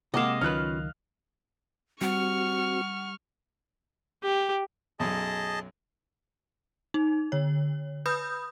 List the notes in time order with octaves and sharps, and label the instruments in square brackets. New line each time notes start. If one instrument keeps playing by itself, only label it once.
[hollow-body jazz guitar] C3 G#3 A#3 [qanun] D#5 F5 [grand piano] F#5 D6 E7
[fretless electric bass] C#2 D#3 F#3 [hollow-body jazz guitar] C#4 F4 B4 [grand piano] F6 F#6
[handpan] G3 [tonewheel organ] C4 F#4 [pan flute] F#5 [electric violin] C#6 F6
[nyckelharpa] G4
[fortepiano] B1 F#2 [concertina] G#4 D#5 A5
[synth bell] D#4
D3 C#5
B4 B5 D#6 G6